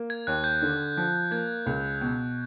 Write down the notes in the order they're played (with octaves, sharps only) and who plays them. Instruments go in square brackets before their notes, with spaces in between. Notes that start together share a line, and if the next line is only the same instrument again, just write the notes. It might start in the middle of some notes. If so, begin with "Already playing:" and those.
Already playing: [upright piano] A#3
[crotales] G#6
[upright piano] D#2 [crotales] F#6
[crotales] G6
[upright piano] D3
F3
[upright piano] A#3 [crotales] G#6
[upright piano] C#2
B2